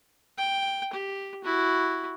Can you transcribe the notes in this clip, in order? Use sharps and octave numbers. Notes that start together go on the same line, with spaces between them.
G5
G4
E4 F#4